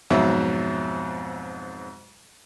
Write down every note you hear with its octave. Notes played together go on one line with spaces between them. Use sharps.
F2 G#2 B2 F#3 E5